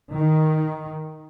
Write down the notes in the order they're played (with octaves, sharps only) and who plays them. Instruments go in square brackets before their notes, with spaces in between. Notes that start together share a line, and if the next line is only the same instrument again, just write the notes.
[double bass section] D#3